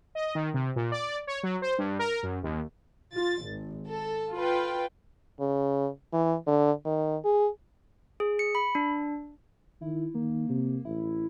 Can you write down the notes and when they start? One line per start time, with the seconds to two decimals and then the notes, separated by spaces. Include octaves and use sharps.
0.15 D#5
0.35 D#3
0.54 C3
0.76 A#2
0.92 D5
1.27 C#5
1.43 F#3
1.62 C5
1.78 G2
1.99 A#4
2.23 F#2
2.43 D#2
3.14 F4 A6
3.45 G#1
3.87 A4
4.33 F4 B4 G5
5.40 C#3
6.13 E3
6.47 D3
6.86 D#3
7.25 G#4
8.20 G#4
8.39 C#7
8.55 B5
8.75 D4
9.81 D#3 E4
10.15 D#3 A#3
10.49 C3
10.85 A1 E4